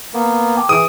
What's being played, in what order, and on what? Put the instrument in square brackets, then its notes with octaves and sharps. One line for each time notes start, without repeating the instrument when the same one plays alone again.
[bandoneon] A#3 B3
[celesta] G5 A5 D6
[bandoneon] E3 [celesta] G#4 B4 D7 [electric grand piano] D#6